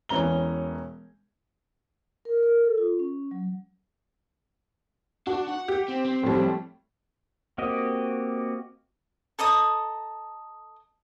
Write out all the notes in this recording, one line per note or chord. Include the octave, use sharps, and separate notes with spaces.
E1 E3 C#4 A#5 G7
A#4
A#4
A4
F4
C#4
F#3
D4 F#4
F#5
G4
C4
C4
A2 F3 G3
A#3 C4 F#4 G4 D#5
A4 D#5 A#5 D#6